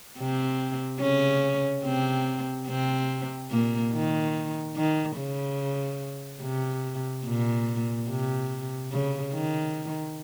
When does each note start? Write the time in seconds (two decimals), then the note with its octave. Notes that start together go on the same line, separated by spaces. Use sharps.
0.18 C3 C4
1.01 C#3 C#4
1.85 C3 C4
2.68 C3 C4
3.51 A#2 A#3
3.93 D#3
4.76 D#3
5.18 C#3
6.42 C3
7.25 A#2
8.08 C3
8.92 C#3
9.34 D#3